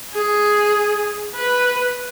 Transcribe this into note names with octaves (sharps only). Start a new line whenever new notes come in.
G#4
B4